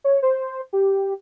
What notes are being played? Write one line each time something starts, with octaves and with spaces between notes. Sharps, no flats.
C#5
C5
G4